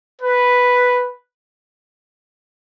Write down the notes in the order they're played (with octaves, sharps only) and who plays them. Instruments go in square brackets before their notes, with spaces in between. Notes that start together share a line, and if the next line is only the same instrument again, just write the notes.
[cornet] B4